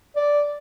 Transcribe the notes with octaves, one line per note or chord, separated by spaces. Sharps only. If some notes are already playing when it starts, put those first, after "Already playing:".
D5